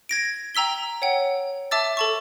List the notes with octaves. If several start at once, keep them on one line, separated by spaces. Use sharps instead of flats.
G#6 A#6 D7
G5 A#5 E6 B6 G7
C#5 F#5 G5
E5 A5 D6 E6 A6
A4 A5 C#6